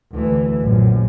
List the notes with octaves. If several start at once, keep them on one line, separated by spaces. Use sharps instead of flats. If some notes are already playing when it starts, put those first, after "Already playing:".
D2 E3
A#1 F#2